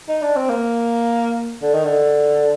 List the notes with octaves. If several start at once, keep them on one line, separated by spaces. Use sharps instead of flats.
D#4
D4
C4
A#3
D3
D#3
D3